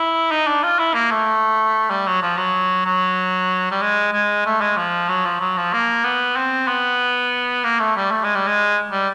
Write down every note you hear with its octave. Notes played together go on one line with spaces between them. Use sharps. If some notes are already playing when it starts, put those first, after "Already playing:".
Already playing: E4
D#4
D4
F4
E4
A#3
A3
G3
F#3
F3
F#3
F#3
G3
G#3
G#3
A3
G#3
F3
F#3
F3
F#3
F3
A#3
B3
C4
B3
A#3
A3
G3
A3
G#3
G3
G#3
G3